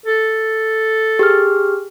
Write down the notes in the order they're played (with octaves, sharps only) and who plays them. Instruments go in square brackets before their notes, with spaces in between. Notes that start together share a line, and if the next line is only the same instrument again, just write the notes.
[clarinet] A4
[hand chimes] G4 G#4 F6